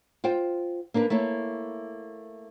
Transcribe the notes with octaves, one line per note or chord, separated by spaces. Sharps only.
F4 C5 G5
A#3 D4 A#4 B4
A3 A#3 E4 C#5